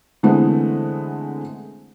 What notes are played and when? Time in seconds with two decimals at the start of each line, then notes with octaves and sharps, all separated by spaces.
0.23 D3 E3 G#3 A3 B3 C4